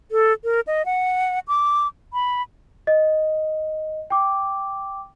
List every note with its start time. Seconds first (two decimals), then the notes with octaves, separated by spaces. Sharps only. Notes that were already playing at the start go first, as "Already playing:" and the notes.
0.11 A4
0.44 A#4
0.67 D#5
0.86 F#5
1.48 D6
2.13 B5
2.87 D#5
4.10 G5 D6